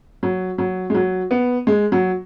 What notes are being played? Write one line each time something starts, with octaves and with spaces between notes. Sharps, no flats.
F#3
F#3
G#3
F#3
B3
G#3
F#3